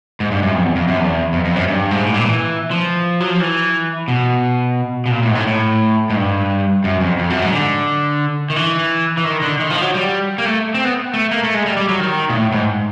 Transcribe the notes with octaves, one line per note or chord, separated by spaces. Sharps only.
G#2
G2
F#2
F2
E2
F2
F#2
E2
F2
F2
F#2
G2
G#2
A2
A#2
E3
F3
F#3
F3
E3
B2
B2
A#2
A2
G#2
A2
A2
G#2
G2
F#2
F2
F2
F#2
G#2
D3
D#3
E3
E3
D#3
D3
D#3
F3
F#3
G3
A#3
A3
C4
B3
A3
A#3
A3
G#3
G3
G3
F#3
D#3
A#2
A2
G#2